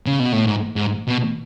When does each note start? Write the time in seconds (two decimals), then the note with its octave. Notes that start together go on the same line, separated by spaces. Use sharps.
0.06 C#3
0.20 B2
0.33 A2
0.46 G#2
0.76 G#2
1.08 B2